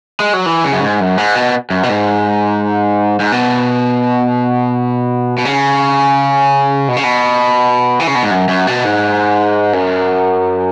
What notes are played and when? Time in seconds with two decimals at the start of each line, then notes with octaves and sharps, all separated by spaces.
0.20 G#3
0.33 F#3
0.46 E3
0.64 C#3
0.73 F#2
0.81 G#2
1.00 F#2
1.17 G#2
1.35 B2
1.70 F#2
1.83 B2
1.89 G#2
3.20 G#2
3.32 B2
5.38 B2
5.45 C#3
6.88 B2
6.96 C#3
7.04 B2
8.00 E3
8.07 C#3
8.15 B2
8.23 G#2
8.31 F#2
8.48 F#2
8.67 B2
8.85 G#2
9.73 F#2